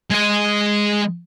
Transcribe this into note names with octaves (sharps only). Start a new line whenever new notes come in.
G#3 D#5